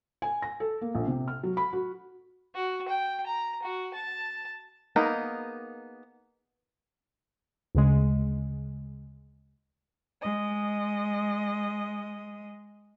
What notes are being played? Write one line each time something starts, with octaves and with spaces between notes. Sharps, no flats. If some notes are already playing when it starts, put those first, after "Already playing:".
G#5
A#6
A4
A#3
A#1
C3
F6
F#3
B5
F#4
F#4
G5
A#5
F#4
A5
A#3 B3 D#4 G#4 A#4
D2 C#3 G#3
G#3 D#5